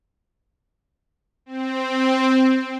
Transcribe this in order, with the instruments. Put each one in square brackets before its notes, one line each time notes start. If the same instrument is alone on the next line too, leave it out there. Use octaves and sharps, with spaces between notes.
[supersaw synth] C4